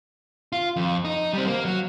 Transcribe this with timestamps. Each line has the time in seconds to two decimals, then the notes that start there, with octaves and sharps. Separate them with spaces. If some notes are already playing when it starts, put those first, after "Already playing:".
0.53 F4
0.76 F2
1.05 D#4
1.33 G3 C4
1.47 A#3
1.65 F#3